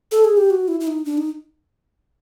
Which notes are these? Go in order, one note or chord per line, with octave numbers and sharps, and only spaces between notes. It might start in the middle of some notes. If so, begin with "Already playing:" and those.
A4
G#4
G4
F#4
E4
E4
D#4
D4
D#4